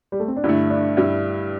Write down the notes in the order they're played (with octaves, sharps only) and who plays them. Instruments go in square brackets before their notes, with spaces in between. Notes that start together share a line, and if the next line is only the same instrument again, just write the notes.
[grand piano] G3
A3
C4
D4
[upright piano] G2 D3 A3 [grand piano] E4
[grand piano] D4
[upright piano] G2 G3 E4